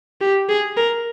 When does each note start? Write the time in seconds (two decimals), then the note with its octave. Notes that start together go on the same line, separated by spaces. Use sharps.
0.21 G4
0.49 G#4
0.77 A#4